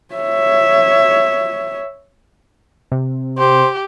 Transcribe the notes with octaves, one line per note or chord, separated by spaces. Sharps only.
C#5 E5
C3
G4 C5